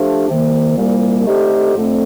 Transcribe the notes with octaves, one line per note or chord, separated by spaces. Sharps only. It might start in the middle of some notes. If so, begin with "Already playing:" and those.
Already playing: F3 A3 D4 G4
C2 C3 D#3 A#3
C2 A#2 G3 A#3
D3 A3 C4 D#4 G4
F2 D3 A3 C4